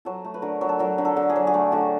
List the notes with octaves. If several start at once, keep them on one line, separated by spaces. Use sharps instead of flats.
F#3 A4
A3
B4
D3 A#4
F#3
A4
F#3 A#4
D3
A4
D3
G#4
F#3
G#4
A3 G4
D3 F#4